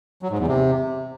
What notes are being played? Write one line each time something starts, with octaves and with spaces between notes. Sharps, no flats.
F#3
G#2
E2
C3